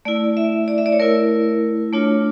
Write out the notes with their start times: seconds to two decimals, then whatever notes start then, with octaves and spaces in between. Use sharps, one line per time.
0.05 A3 E4 D5
0.37 E5
0.68 D5
0.78 E5
0.86 D5
0.93 C#5
0.99 A3 E4 A#4
1.93 A3 D4 F4 C#5